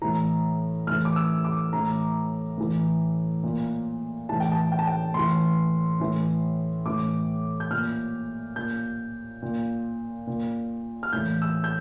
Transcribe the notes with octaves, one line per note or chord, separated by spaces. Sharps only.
A2 E3 A#5
A2 E3 F6
D6
E6
D6
A2 E3 A#5
A2 E3
A#2
A2 E3 A5
G5
A5
G5
A5
G5
A2 E3 C6
A2 E3
A2 E3 D6
G6
A#2 F6
A#2 G6
A#2
A#2
F6
A2 E3 G6
E6
G6